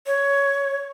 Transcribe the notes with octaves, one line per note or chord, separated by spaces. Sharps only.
C#5